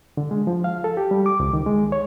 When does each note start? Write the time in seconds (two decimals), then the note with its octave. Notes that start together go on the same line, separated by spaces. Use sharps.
0.17 D3
0.31 G#3
0.47 F3
0.64 F5
0.84 A4
0.97 G4
1.11 G3
1.26 D6
1.40 C#2
1.53 D#3
1.66 G#3
1.92 C#5